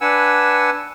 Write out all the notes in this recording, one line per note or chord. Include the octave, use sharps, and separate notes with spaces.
D4 B4 F#5 G#5 E6